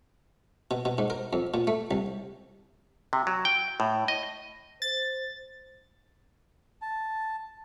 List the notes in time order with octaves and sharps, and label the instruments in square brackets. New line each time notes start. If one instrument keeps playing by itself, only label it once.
[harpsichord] B2
B2
G#2
A#4
F2
A#2
A3
C2
[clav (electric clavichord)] C3
F#3
G5
A2
D#5
[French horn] C5 [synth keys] A6
[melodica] A5